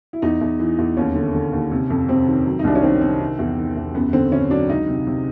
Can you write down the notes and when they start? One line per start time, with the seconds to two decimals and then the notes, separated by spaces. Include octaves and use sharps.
0.13 E4
0.22 E2 D#4
0.41 E2
0.60 E3
0.78 E2
0.97 D#2 C#4
1.15 D3
1.34 D3
1.53 D#2
1.71 C3
1.90 F2
2.08 C3 C4
2.27 D#3
2.46 F#3
2.59 D#4
2.64 C2 D4
2.75 C#4
2.83 D#3 C4
3.01 C3 C4
3.20 D#3
3.39 E2
3.58 D#3
3.77 E2
3.94 F#2 B3
4.13 D3 C4
4.32 D3 C#4
4.50 F#3 D4
4.69 C#2 D#4
4.88 C3
5.07 C3